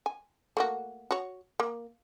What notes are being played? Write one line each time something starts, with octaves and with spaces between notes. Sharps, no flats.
G#5
A3 A#3 F#4
F#4 C#5
A#3